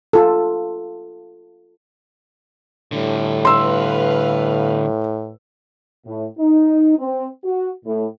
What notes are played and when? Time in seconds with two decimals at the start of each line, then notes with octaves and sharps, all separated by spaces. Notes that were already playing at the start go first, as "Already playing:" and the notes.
0.13 F4 A4
2.92 A2 D3 G3
3.45 B4 F5 C6 E6
6.06 A2
6.39 D#4
6.98 C4
7.44 F#4
7.85 A2